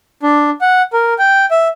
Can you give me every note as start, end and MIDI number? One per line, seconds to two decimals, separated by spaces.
0.23 0.50 62
0.61 0.82 78
0.93 1.14 70
1.19 1.46 79
1.51 1.68 76